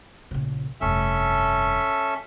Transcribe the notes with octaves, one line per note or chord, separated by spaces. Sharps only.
A#1 C#3
F1 G2 C#4 A4 E5